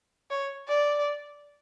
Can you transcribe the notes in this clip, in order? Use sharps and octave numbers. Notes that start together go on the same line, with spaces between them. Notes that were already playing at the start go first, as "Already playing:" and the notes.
C#5
D5